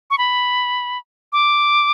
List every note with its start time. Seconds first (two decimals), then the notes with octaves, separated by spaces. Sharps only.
0.11 C#6
0.18 B5
1.33 D6